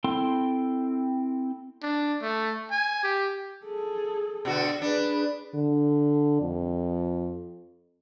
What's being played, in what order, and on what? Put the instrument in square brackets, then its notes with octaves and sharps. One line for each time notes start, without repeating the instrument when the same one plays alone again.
[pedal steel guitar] C4 E4 A4 G5 C6
[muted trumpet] D4
A3
G#5
G4
[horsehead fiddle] G#4 A4
[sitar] B2 D3 F#4
[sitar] D4 [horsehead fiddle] G#4 B4
[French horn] D3
F2